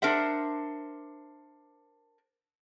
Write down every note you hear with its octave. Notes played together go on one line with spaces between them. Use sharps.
D4 A#4 C5 E5 F#5